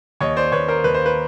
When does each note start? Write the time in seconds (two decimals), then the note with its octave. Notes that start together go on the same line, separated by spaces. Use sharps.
0.21 D#2 C#5 D#5
0.36 C5 D5
0.52 D#2 B4 C#5
0.68 A#4 C5
0.84 D#2 B4
0.94 C5
1.06 B4